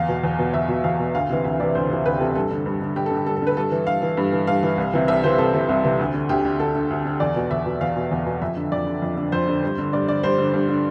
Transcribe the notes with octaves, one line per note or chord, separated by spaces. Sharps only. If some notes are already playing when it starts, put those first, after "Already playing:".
Already playing: E2 F5
B2
E2
B2
E2 E5
B2
E2 F5
B2
D2 F5
C3 E3
D2 E5
C3 E3 D5
D2 C5
C3 E3
D2 B4
G4
C3 E3 A4
G2 A4
D3
G2
D3
G2 G4
A4
D3
G4
G2 A4
A4
D3 B4
G2 A4
E3
G2 F5
E3
G2
E3
G2 F5
E3
C2
C3 E3
C2 E5
C3 E3 C5
C2 A4
C3 E3
C2
C3 E3
D2
D3
D2 G4
D3
D2 A4
D3
D2
D3
E2 D5
B2
E2 E5
B2
E2 F5
B2
E2
B2
F2 E5
D3
F2 D5
D3
F2
D3
F2 C5
D3
G2
D3
G2 D5
D3 D5
G2 C5
D3
G2
D3